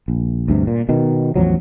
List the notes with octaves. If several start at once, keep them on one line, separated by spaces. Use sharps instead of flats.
A#1
D2 G2 C3
A#2
B2 D#3
A1 E2 F3 F#3